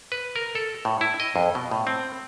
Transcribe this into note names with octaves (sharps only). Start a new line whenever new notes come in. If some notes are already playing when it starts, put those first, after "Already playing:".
B4
A#4
A4
A2
E4
D#5
F2
B2
A2
C4